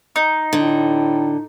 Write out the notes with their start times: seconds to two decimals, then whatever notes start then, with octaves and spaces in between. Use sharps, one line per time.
0.16 D#4
0.53 A2 D3